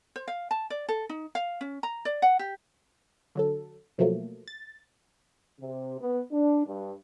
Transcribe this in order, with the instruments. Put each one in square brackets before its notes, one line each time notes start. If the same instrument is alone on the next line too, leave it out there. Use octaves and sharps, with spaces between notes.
[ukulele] C5
F5
A5
D5
A4
D#4
F5
C#4
A#5
D5
F#5
G4
[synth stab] D3 F#3 A4
B2 F3 F#3 A3 A#3
A6
[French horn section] C3
B3
D4
G2